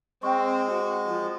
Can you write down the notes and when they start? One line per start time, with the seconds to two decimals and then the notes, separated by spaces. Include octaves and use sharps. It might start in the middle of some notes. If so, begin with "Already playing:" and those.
0.23 G#3 C4 G5 C#6
0.71 F#4
1.08 F3